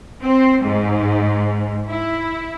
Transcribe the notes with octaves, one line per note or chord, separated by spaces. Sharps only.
C4
G#2
E4